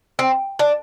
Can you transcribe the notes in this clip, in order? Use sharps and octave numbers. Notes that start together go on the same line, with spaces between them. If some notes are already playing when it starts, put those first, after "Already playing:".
C4
D4